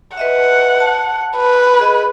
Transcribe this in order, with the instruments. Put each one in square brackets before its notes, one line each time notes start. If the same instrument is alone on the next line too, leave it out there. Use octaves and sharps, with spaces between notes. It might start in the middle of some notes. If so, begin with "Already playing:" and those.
[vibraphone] B4 D#5 E5 [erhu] F#5
[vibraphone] A5
[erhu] B4
[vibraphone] G#4 D#5